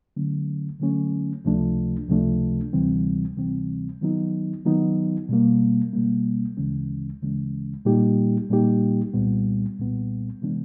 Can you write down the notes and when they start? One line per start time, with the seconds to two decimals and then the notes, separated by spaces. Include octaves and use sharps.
0.17 D3 F#3 A3 C#4
0.80 D3 F#3 A3 C#4
1.45 C#2 C3 F3 A3 D4
2.08 C#2 C3 F3 A3 D4
2.73 D2 C3 E3 G3 C4
3.37 D2 C3 E3 G3 C4
4.01 D#3 F#3 B3 D#4
4.65 D#3 F#3 B3 D#4
5.29 B2 G3 A#3
5.93 B2 G3 A#3
6.57 D2 C#3 E3 G#3 C#4
7.21 D2 C#3 E3 G#3 C#4
7.85 A#2 G3 A#3 D#4 G4
8.49 A#2 G3 A#3 D#4 G4
9.13 C2 A#2 G3 B3
9.78 C2 A#2 G3 B3
10.42 C3 E3 G#3 B3 D4